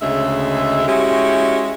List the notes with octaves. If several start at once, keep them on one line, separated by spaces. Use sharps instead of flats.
D2 C#3 G#3 E5
G#3 C#4 E4 F#4 G4